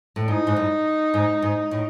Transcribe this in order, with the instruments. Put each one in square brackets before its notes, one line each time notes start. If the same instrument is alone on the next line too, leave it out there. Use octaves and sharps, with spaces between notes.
[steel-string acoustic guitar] A2
[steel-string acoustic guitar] G#2 [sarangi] D#4
[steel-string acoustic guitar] G#2
G2
G#2
G#2
A2